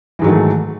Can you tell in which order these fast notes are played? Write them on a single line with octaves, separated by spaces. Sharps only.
E3 G#2 F#3 D#3 A3